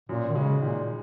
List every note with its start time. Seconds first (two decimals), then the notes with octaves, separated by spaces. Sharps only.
0.09 F#2 A#2
0.29 D#3
0.35 C#3 G#3
0.61 A#2 D#3